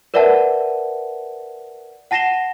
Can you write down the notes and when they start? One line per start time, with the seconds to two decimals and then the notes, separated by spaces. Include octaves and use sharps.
0.14 A#4 B4 D5 E5 F#5 A5
2.11 F#5 A5 A#6 C7 E7 G7